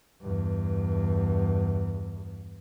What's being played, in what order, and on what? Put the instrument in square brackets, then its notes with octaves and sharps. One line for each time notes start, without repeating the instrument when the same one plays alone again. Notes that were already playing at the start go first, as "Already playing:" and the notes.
[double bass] E2 G2